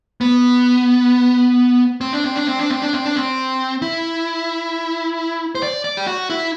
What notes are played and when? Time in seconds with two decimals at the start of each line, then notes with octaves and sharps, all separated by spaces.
0.21 B3
2.01 C4
2.13 D4
2.24 C4
2.35 D4
2.48 C4
2.59 D4
2.70 C4
2.82 D4
2.93 C4
3.05 D4
3.16 C4
3.82 E4
5.55 C5
5.63 D5
5.84 D5
5.97 G4
6.07 F#4
6.30 E4